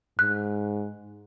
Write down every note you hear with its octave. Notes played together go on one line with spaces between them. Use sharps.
G#2 F#6